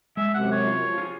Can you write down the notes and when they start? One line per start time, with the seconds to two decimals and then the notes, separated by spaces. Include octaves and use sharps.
0.17 G#3 E5
0.34 F#2 C3 F#5
0.52 C#5
0.67 F4
0.84 F3
0.98 F4 F#4 G#4